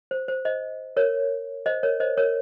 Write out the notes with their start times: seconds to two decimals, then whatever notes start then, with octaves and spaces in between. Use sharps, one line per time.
0.11 C5
0.28 C5
0.45 C5 D#5
0.97 A#4 C#5
1.66 C5 D#5
1.83 A#4 C#5
2.00 C5 D#5
2.17 A#4 C#5